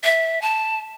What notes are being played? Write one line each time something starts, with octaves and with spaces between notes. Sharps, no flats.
E5
A5